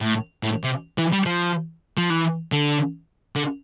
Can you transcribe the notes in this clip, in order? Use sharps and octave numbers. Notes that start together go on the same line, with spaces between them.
A2
A2
C3
E3
G3
F3
F3
E3
D3
D3